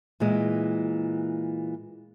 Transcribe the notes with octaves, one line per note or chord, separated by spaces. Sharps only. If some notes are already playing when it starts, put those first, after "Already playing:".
A#2 E3 G#3